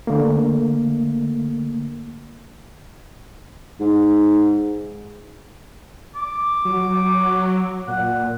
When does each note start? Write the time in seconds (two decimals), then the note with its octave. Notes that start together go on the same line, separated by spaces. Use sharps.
0.07 D3 A3 A#3
3.80 G#2
6.15 D6
6.65 F#3
7.88 A#2 F#5